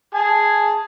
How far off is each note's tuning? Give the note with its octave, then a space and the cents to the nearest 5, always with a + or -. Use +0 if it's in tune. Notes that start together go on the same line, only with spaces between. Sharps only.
G#4 +0 A5 +0